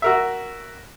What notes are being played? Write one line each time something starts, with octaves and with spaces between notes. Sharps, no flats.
F#4 A#4 E5